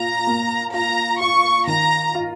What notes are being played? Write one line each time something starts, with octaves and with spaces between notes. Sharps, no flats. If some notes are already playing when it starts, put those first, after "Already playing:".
Already playing: A#2 F4 A#5
A#3
F4 A#5
F4 C#6
D#3 A#5
F4